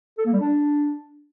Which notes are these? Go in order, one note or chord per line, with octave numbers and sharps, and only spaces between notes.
A4
A#3
G3
D4